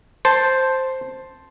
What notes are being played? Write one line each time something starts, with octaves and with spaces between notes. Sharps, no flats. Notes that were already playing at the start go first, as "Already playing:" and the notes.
C5 A5